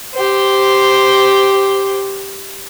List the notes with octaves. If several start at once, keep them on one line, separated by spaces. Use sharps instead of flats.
G4 C5